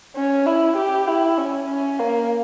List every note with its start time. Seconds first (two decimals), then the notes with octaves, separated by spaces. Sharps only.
0.16 C#4
0.46 E4
0.77 G4
1.07 E4
1.37 C#4
1.68 C#4
1.99 A#3